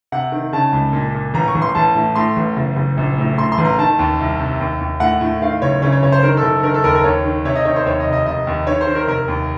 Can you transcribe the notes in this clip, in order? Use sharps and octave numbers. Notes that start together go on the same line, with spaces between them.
C3 F#5
D#3
C#3 A5
C#2
A#2
A#2
A1 A#5
C#6
A1
C6
A1 A5
A2
A2 C6
A1
F#1
F#1
A#1
A2
A2 C6
C6
A1
A#5
D#3 A5
D#2
C2
C3
D#2
D#2
A2 F#5
A2
D#3 F5
F#1 C#5
C#3 C#5
C#5
F#1 C#5
C5
D#3 A#4
A4
F#1
D#3 A#4
A4
D#2 A#4
A#4
D#2 C#5
D#3
C3 C#5
D#5
D#3 C#5
C5
D#2 C#5
D#5
F1
D#5
F1 D#5
D#2
D#3 C#5
C5
D#3
A#4
F1 A#4
D#2